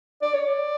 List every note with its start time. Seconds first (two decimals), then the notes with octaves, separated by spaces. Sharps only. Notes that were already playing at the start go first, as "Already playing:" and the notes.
0.22 D5
0.34 C#5
0.47 D5